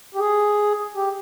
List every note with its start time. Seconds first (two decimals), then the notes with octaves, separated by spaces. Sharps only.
0.15 G4
0.19 G#4
0.96 G4